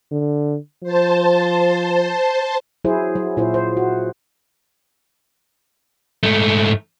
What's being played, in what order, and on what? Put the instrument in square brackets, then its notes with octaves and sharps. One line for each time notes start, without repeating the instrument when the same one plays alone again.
[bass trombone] D3
[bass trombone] F3 [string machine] C5 A5
[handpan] F#3 E4 G#4 C5
F#3
A#2 E4 F4 C5
C5
F#4
[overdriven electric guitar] G#2 A3